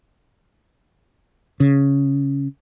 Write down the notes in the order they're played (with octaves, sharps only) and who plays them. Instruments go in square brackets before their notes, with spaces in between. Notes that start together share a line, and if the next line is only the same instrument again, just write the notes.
[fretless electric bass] C#3